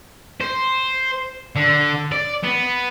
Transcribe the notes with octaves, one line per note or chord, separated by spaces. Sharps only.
C5
D3
D5
B3